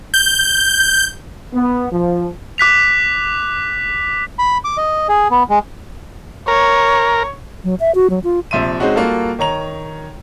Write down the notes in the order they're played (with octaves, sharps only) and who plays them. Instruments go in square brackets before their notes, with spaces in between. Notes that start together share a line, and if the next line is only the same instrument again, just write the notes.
[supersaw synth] G6
[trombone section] B3
F3
[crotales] D6 F#6 B6 F7
[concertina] B5
D6
D#5
G#4
B3
G#3
[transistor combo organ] A#4 [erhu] C#5
[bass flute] F#3
E5
F#4
F#3
F4
[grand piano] A#1 C3 F3 E5 C6 D#7
G#3 C4 C#4 D#4 F#4
G3 A#3 F4 F#4 A4
D#3 C#5 A#5 F7